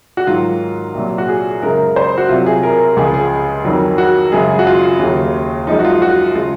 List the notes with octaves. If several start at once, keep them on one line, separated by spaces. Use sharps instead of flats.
F#4
G#2 D#3 F#3 F4
C2 A#2 F#3
F#4
G#4
F#2 C#3 G#3 A#4
C5
F#4
C2 C3 F#3 F4
G#4
A#4
C#2 C#3 F3 G#3 G#4
G#4
F2 D#3 F#3
F#4
F#2 C#3 G#3 G#4
F#4
F4
D#2 C#3 F#3
F#2 F3 G#3 D#4
F#4
F4
F#4
C#3 G#3 F4